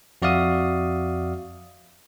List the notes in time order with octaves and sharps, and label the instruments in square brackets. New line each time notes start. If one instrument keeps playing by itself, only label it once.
[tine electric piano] F2 F#4 D5 E5 F5 D#6